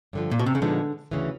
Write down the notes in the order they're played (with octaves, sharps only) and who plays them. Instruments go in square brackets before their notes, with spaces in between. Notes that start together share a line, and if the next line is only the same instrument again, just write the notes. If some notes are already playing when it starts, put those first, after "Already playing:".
[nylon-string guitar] G2 D3 F3
[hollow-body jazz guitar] A#2
B2
C3
C#3
[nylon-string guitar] A#2 F3 G#3 B3 D#4 [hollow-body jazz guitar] D3
[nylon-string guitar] D2 C#3 E3